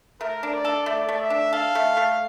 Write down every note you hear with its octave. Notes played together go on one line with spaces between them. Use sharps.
A3 A#4
D4
D5
A4
A3 D5
A3
E5
D4
A4 F5
A3
A3